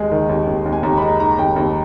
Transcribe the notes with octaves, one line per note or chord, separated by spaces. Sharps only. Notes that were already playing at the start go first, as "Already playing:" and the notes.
Already playing: D#2 G#3 G#5
D#3
D#2
D#2
D#2
G#5
D#2 A#5
B5
G#3 A#5
D#3 A#5
D#2 G5
D#2